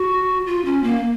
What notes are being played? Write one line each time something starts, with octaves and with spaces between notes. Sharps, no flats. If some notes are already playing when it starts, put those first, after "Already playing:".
Already playing: F#4
F4
C#4
A#3